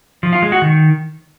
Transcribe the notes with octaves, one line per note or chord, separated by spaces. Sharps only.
F3
F4
G#3
F#4
D#3